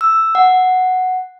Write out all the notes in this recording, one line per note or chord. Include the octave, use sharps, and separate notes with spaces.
E6
F#5